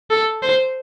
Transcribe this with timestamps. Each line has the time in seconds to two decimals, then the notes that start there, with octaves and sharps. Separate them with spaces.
0.10 A4
0.42 C5